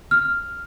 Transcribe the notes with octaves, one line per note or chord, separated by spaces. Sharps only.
F6